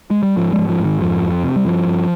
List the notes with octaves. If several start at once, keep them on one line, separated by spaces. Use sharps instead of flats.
G#3
G3
G#2 F3
F3 G#3
G#2
F3
G#2 D#3
F2 F3
F2
C3
G3
G2 F3
G2